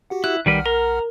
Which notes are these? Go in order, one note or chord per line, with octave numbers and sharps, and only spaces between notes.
F#4 G4 F#5
E4 F#6
B1 D#3 G3 B4 F#5 F6
A#4 A#5